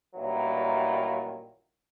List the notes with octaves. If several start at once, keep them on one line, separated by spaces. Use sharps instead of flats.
A1 G2 A#2 D#3 E3 F#3